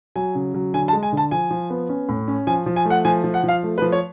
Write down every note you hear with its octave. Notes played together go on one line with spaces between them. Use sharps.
F#3 G#5
C#3
F#3
D3 G#5
A5
G#3
G#5
D3 A5
F3 G#5
F3
B3
C#4
A2
C#4
F3 G#5
F3
G#5
A3
F#5
F3 G#5
F3
F#5
F3 F5
A3
B4
F3
C#5